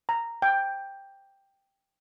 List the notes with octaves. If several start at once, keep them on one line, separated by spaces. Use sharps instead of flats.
A#5
G5